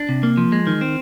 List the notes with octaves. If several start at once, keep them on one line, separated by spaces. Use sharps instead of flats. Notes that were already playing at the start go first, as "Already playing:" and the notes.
Already playing: D4
C3
A#3
F3
G#3
D#3
C4